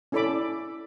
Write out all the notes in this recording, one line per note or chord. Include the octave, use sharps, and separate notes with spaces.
C#4 E4 A4 D5 B5 D6